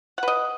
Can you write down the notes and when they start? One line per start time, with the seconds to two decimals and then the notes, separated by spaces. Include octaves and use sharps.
0.18 F#5
0.23 B4
0.28 D#5